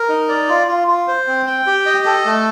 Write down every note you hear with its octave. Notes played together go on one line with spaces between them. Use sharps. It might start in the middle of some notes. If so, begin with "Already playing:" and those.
Already playing: A#4
D#4
D5
F4
F4
F4
C5
C4
G5
G4
D#5
A4
A3